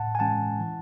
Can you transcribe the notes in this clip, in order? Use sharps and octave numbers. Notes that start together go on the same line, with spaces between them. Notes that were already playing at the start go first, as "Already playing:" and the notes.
Already playing: A2 F#5 A5
G#5
E3 G#3 C#4 F#5 A5
E3